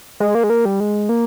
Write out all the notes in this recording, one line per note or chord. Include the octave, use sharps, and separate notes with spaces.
G#3
A#3
G#3
A#3
G3
G#3
A#3